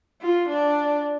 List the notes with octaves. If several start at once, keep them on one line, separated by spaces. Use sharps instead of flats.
F4
D4